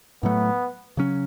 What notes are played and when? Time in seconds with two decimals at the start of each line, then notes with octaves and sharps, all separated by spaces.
0.23 A2 F#3 A3 B3
0.97 C#3 F#3 C#4